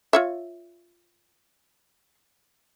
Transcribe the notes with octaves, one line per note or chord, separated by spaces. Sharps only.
F4 C#5 E5